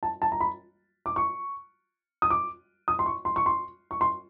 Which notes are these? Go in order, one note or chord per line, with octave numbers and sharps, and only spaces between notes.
A5
A5
A#5
B5
D6
C#6
D#6
D6
D#6
C6
C#6
C6
C#6
C6
C#6
C6